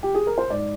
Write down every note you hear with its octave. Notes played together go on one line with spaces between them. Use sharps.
G4
G#4
A#4
C5
G#2 D5